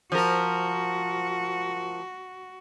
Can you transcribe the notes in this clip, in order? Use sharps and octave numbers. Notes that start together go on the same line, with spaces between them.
F3 F#4 A#4